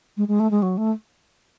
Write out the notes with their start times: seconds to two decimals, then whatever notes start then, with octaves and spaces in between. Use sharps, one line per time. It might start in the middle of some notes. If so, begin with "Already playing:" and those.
0.17 G#3
0.28 G#3
0.40 A3
0.51 G#3
0.62 F#3
0.77 A3